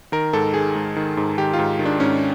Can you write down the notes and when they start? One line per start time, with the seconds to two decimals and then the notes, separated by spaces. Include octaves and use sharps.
0.12 D#3 A#4
0.33 G#2 A4
0.54 D#3 G#4
0.75 G#2
0.96 D#3
1.17 G#2
1.38 D#3 G4
1.53 F4
1.59 G#2
1.79 D#3
1.85 D4
2.00 G#2 C#4